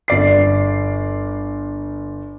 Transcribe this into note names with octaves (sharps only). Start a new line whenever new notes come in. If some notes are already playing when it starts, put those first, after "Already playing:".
G1 D5 C7